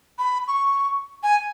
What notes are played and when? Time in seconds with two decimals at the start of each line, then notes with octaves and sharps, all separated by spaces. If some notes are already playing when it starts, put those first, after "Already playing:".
0.18 B5
0.48 C#6
1.23 G#5